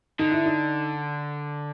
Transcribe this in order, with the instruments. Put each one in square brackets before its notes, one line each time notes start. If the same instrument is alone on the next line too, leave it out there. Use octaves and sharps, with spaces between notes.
[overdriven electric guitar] D3 [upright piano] D#4
[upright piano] E4
D#4